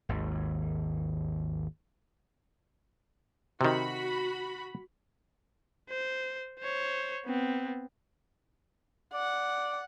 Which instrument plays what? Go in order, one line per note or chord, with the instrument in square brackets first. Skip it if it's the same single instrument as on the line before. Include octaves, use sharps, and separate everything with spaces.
[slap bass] G#1 D#2
[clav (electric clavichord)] C3 D#3 [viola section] F#4 B5
[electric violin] C5
C5 C#5
B3 C4
[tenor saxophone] D5 [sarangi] F#5